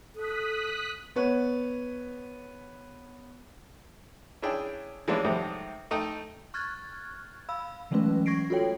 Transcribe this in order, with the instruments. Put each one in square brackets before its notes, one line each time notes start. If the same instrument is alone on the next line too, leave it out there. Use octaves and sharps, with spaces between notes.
[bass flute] A4 [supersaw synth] D#6 F#6 B6
[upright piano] B3 B4 C#5
[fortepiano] C#4 D4 E4 G#4 G5
E3 G3 G#3 A#3 C#4 D4
G#2 C3 D#3 G3 A3
A3 D#4 G5 D#6
[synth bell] C#6 F6 F#6 G#6 A6
F5 B5 E6
E3 F#3 G#3 A3 C#4 B4
C#6 G#6 A#6 C7 D7
F4 F#4 A4 C#5 G5